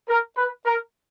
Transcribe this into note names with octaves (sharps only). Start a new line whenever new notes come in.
A#4
B4
A#4